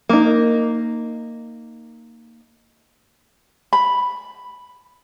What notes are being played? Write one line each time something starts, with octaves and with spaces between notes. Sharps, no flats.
A#3 D#4
B5